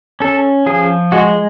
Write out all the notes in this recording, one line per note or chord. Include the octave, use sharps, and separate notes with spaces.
C#4 A4
F3 G#4
G#3 F#4